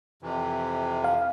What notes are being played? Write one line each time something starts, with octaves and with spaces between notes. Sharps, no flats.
F2 C3 E3
F5